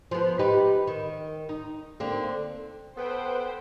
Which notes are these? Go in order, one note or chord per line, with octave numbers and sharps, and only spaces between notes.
F3 B3
D#4 G4 B4
D#3
D#4
D3 A#3 C4
B3 A4 B4 C5 G5